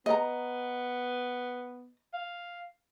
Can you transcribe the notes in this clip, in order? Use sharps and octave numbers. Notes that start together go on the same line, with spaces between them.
B3 D#5 A#5
F5